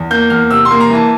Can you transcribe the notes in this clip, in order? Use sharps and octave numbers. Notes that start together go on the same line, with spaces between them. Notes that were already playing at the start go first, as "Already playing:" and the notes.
Already playing: E2
A#3 G6
E2 F6
C3 E6
C6
A#3
A#5
E3
A5